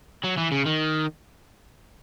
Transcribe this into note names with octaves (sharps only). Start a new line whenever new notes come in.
F#3
E3
C#3
D#3